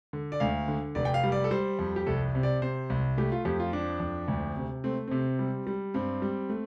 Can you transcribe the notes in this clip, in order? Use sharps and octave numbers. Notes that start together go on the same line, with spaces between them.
D3
D5
D2 F5
D3
F1 D5
G5
F5
G3
D5
A4
G3 C5
F2
G4
C2 A4
C3
D5
C3 C5
C2
A3 G4
F4
F2 G4
F4
F3 D4
F2
D2
C3
A3 C4
C3 C4
G3
G3
G2 C4
G3
A3